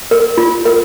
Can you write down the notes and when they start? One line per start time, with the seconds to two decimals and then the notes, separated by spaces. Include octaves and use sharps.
0.11 A#4
0.38 F4
0.66 A#4